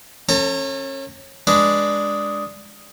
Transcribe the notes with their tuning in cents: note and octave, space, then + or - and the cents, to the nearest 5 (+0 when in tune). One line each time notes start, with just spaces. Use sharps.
C#4 -30 A4 +25 A#5 -25
G#3 +5 D4 +0 B4 +0